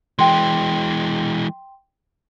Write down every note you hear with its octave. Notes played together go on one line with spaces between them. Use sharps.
E3 G#3 G5 C6